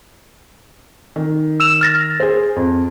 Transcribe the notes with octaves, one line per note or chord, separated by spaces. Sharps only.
D#3
E6 E7 F7
F6 A6 A#6
G#4 C5
F2